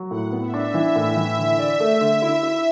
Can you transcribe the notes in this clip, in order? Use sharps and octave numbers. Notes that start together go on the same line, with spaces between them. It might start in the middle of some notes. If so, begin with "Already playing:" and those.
Already playing: F#3
A2 F#5
B3
E5
D4
E3 E5
A2
E3
D3 E5
D5
A3
D3
E4
E4